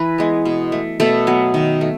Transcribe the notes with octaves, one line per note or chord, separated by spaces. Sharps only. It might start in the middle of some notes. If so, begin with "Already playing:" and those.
Already playing: E3 B4
G#3 B3
B2
A3
B2 A3 A4
F#3 B3
D#3
A3